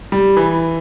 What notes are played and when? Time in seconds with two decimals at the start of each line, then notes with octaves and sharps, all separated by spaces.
0.12 G3
0.37 E3